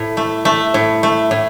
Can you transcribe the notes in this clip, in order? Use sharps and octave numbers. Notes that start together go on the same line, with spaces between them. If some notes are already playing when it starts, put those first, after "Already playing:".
Already playing: A2
A3
A3
A2
A3
A2